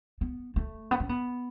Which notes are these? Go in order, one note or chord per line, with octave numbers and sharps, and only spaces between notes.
B3
A3
B3
C#4
B3